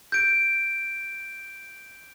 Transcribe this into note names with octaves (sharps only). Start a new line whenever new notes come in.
G6 D7